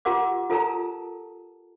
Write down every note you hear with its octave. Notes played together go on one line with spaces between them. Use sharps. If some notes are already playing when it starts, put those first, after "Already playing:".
F4 G4 A#4 F#5 D6
F4 A4 A#4 A5 A#5